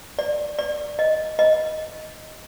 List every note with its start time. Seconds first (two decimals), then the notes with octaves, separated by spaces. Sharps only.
0.19 D5
0.59 D5
0.99 D#5
1.39 D#5